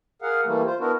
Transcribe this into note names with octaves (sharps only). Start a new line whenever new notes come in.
G#4 A#4 F5 F#5
E3 G3 A3 A#3
F4 C5
B3 D4 E4 F#4 A#4